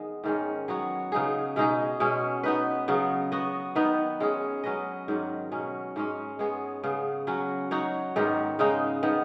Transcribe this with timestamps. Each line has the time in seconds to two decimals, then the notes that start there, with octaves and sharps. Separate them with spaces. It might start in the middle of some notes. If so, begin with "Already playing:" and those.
Already playing: D#3 G#3 B3 D#4
0.24 G#2 D#3 G#3 C#4
0.68 F#3 B3 F#4 C#5
1.12 C#3 B3 D#4 G#4
1.56 B2 G#3 D#4 G#4
2.00 B2 G#3 C#4
2.43 B3 D#4 B4
2.88 C#3 F#3 B3
3.32 B3 F#4 D#5
3.75 D#3 B3 D#4 B4
4.20 G#3 C#4 G#4
4.64 F#3 C#4 B4 D#5
5.08 G#2 D#3 F#3
5.52 B2 F#3 C#4
5.96 G#2 G#3 C#4
6.39 G#3 B3 G#4 C#5
6.84 C#3 B3 G#4
7.27 F#3 C#4 F#4
7.71 F#3 D#4 F#4 C#5
8.16 G#2 D#3 B3 F#4
8.59 C#3 G#3 D#4
9.03 D#3 B3